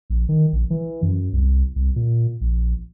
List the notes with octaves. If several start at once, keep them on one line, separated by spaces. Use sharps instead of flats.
A#1
D#3
A#1
E3
F#2
C2
C2
A#2
A#1